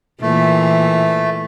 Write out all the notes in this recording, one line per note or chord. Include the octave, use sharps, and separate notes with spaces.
A#2 E3 A3